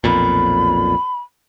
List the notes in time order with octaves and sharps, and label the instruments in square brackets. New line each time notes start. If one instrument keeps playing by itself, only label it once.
[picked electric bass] B1 F2 A#2 [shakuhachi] B5